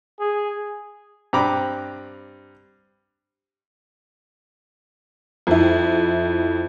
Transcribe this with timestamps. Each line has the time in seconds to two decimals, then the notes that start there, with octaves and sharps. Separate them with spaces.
0.20 G#4
1.33 G2 C4 A#5 B5 D6
5.47 F2 E4